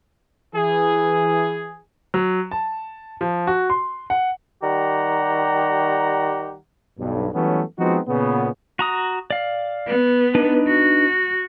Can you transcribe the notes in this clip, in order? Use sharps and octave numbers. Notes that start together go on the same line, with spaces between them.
E3 G#4
F#3
A5
F3
F#4
C6
F#5
D#3 G3 G4 F#5 A#5
B1 G2
E3 F#3 G3 A3 B3 C#4
F3 G#3 B3 C4 D#4 F#4
A#2 C#3 B3
F#4 A#5 D#6
D5 F5
B3
D4 D#4 B4
F#4